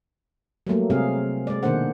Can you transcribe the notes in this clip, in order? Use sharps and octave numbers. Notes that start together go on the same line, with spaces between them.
F#3 G3 A3 A#3
C3 G#3 C4 G#4 F5
G#3 D5
B2 D#3 A#3 D4 C5 F#5